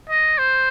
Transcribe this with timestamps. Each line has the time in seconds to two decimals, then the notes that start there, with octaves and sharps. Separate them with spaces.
0.10 D#5
0.38 C5